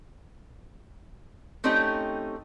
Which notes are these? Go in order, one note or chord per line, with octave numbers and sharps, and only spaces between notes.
A3 C4 C#4 D#4 G4